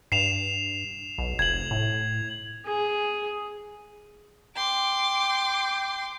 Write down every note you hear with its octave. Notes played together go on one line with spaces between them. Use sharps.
G2 C7 E7 F7
B1
F1 G#6 F#7
A2
G#4
G5 C6 D6